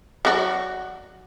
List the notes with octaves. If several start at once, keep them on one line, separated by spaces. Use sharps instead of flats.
F#3 F#4 D5